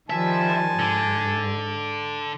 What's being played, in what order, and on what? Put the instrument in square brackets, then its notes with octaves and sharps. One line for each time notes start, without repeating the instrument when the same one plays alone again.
[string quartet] D#3 F3 G3 [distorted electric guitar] E5 [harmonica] G#5 A5
[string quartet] G#2 [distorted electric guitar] D3